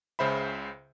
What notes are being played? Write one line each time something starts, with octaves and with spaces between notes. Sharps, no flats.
C#2 C#3 C5 E5 B5